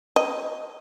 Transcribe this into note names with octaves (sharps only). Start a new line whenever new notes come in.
D#5